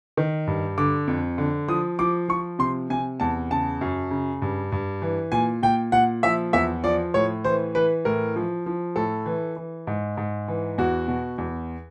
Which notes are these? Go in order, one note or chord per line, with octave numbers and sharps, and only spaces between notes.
D#3
G2
D3 D6
F2
D3
F3 D#6
F3 D6
F3 C#6
C3 C6
C3 G#5
E2 A5
C#3 A5
F#2
C#3
G2
G2
E3
A#2 G#5
A#2 G5
A#2 F#5
F3 E5
E2 E5
F3 D5
A2 C#5
E3 C5
E3 B4
A2 A#4
F3
F3
A2 A4
E3
E3
G#2
G#2
E3
E2 F#4
B2
E2